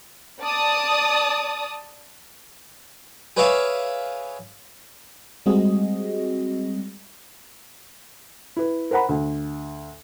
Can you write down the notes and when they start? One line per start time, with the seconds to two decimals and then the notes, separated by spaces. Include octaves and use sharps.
0.41 D5 A5 D#6
3.37 G#4 B4 C#5 D5 E5 F5
5.46 G3 G#3 C4 F#4 G#4 D#5
8.57 E4 B4
8.91 A#4 C5 F#5 A#5 B5
9.09 D2